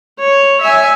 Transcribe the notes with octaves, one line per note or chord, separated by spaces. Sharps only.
C#5
E5 G#5